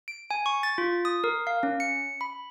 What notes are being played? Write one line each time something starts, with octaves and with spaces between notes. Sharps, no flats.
D7
G#5
C#6
A6
F4
D#6
A#4
F5
C#4
C#7
B5